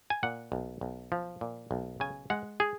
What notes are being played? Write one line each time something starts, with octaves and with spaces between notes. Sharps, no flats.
G#5
A#2 F#5
B1
B1
F3
A#2
B1
C#3 G#5
G#3 F#5
G#4